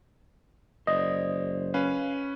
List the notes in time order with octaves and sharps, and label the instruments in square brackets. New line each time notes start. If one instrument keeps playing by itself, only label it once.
[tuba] F#1 [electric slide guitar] C5 D5 [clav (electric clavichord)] D#5
[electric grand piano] C#4 B4 [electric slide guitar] F5